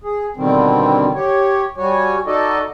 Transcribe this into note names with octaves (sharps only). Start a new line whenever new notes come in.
G#4
B2 D3 D#3 G3 C4
G4 C#5
G3 F#4 C#5 G#5
D#4 F#4 A4 D5 D#5